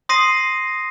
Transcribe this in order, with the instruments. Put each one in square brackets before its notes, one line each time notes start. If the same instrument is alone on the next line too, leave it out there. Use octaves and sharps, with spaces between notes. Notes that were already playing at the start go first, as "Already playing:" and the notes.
[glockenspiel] C6 D#6 A#6 C7 D#7